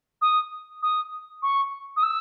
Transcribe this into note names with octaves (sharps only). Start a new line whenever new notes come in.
D#6
D#6
C#6
D#6
E6